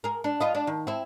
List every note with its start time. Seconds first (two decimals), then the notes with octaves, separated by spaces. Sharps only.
0.04 G#4 A#4
0.24 D4
0.40 F4 B4 D#5
0.55 D4
0.67 D#3
0.87 C4 E4